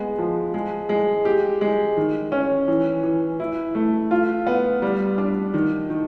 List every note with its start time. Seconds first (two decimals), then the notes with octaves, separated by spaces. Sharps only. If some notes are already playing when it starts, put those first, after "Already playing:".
Already playing: G#3 B3
0.18 F3
0.54 G#3
0.89 G#3
1.25 G4
1.61 G#3
1.97 D#3
2.32 C#4
2.68 E3
3.03 E3
3.40 E4
3.75 A3
4.11 F4
4.47 B3
4.82 G3
5.18 D4
5.54 D#3
5.90 D#3